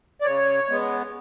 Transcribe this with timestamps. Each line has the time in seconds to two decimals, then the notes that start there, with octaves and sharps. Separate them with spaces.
0.21 D5
0.25 C#3 C#5
0.69 G#3 B3